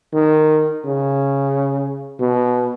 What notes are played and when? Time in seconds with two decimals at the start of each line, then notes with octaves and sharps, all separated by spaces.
0.13 D#3
0.85 C#3
2.19 B2